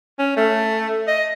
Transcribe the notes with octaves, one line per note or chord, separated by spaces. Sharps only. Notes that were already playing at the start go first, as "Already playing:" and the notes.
C#4
A3
D#5